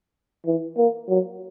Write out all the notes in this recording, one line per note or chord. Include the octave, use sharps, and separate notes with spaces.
E3
A#3
F#3